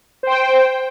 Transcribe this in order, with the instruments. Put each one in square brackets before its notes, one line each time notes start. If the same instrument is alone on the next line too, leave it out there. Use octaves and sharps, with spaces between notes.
[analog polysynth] C5 G5